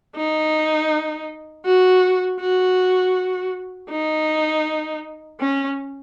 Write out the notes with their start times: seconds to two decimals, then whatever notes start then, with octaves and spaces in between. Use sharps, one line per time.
0.17 D#4
1.65 F#4
2.41 F#4
3.91 D#4
5.40 C#4